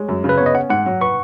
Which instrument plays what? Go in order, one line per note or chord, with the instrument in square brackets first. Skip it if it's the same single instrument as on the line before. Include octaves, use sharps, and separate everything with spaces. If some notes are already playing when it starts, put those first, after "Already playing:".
Already playing: [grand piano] G#3 [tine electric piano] C#5
[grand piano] F#2
C#3
[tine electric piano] B4
[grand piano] B3 [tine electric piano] C#5
[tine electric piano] D#5
[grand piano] C#4 [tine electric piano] F#5
[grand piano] G#2 [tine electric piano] F#5
[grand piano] F#3
[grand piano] B4 [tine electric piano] C#6